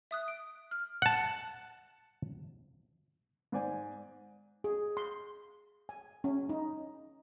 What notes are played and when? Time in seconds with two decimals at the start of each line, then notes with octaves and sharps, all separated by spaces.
0.11 E5 D#6 F#6
0.28 D7
0.71 F6
1.02 F#5 A5
3.52 G#2 C5 D5 G#5
4.64 G#4
4.97 C6
5.89 G#5
6.24 C#4
6.49 D#4